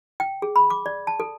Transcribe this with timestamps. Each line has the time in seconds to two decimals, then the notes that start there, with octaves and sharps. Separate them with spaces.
0.20 G5
0.42 G#4
0.56 B5
0.70 D6
0.86 D5
1.07 A5
1.20 A4